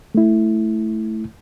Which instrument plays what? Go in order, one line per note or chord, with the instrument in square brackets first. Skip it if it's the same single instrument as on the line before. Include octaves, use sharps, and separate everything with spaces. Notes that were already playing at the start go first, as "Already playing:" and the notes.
[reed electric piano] A3 E4